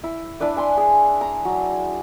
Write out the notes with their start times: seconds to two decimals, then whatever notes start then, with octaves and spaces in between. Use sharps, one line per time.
0.03 E4
0.40 D4 E4 B4 D5
0.57 G#5 C6
0.77 G#4
1.21 A#5
1.45 F#3